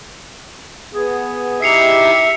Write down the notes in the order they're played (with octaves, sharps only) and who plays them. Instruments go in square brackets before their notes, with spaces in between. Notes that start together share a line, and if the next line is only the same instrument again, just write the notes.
[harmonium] B3 [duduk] G#4
[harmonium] D#4 E4 G4 [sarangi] E5 [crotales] C7 C#7 F7